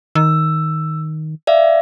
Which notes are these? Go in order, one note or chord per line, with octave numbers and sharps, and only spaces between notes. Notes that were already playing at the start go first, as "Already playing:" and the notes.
D#3 E6
D5 E5 F5